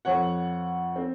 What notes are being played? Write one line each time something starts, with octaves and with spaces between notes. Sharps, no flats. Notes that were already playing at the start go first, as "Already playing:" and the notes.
F2 F3 C#5 F#5
C4